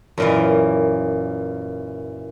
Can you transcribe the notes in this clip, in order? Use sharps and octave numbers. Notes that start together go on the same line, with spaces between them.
F#2 A#2 E3